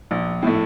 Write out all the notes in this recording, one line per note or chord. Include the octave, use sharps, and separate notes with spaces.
A#1
A2 A3